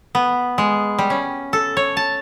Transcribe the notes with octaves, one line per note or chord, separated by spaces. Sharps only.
B3
G#3
G3
C#4
A4
C#5
A5